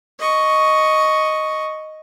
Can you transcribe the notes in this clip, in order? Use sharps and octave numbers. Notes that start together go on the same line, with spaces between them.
D#5 C#6